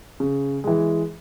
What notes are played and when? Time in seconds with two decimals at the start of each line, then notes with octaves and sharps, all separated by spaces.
0.20 C#3
0.64 E3 G#3